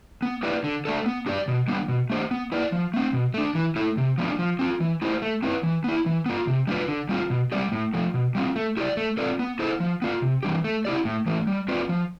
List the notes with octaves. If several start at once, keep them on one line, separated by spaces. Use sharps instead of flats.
B3
E4 G4 B4 D5
D3
A3 D4 A4
B3
D4 G4 D5
B2
G3 B3 D4
B2
A3 D4 G4 C5
B3
E4 B4 D5
F3
A3 C4
B2
A3 D4
E3
A3 E4
C3
F3 B3 D4
F3
C4 F4
E3
A3 E4 G4 C5
A3
C4 E4 B4
E3
B3 E4
E3
B3 F4
C3
G3 D4 F4 B4
D3
G3 C4 F4
B2
G3 C4 G4 D5
A2
F3 A3
B2
G3 C4 F4
A3
E4 G4 D5
A3
C4 F4 A4 D5
B3
E4 A4 C5
F3
B3 F4
C3
E3 G3 D4 G4
A3
E4 G4 D5
A2
E3 A3
G3
C4 F4 B4 D5
F3